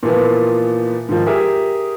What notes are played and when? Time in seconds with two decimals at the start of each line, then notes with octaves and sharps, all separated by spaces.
0.03 A#2 E3 F3 A#3 B3
1.09 G#2 D#3 F3
1.26 G4 G#4 A#4 E5